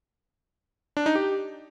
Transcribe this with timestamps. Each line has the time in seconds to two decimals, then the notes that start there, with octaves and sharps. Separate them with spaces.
0.97 D4
1.06 D#4
1.15 G4